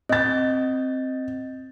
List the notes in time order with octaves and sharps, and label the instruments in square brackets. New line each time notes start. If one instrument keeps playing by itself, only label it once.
[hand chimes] C4 G6 [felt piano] D#5 A6